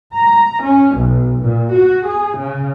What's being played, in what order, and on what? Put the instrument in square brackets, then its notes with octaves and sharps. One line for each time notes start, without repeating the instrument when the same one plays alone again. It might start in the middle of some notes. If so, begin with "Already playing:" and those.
[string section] A#5
C#4
B1
A#2
F#4
G#4
C#3